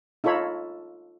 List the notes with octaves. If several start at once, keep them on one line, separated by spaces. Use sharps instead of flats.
D#4 F4 A4 C#5 B5